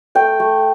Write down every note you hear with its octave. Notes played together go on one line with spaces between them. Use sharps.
A3 G5
A3